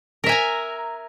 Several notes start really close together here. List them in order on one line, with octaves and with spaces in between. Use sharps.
A#4 E5 G#5 A#5